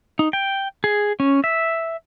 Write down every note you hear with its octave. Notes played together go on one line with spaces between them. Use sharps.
D#4
G5
G#4
C#4
E5